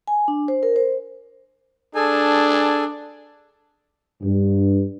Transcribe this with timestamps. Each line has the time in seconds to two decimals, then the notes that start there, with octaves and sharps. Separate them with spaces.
0.08 G#5
0.28 D4
0.48 C5
0.63 A#4
0.76 C5
1.95 D4 G#4 A4 G#5
4.23 G2